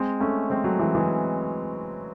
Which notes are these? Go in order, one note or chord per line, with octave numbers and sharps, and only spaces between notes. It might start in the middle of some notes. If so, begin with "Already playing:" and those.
Already playing: G#3 C4
A3 C#4
G#3 C4
F#3 A3
E3 G#3
E3 G#3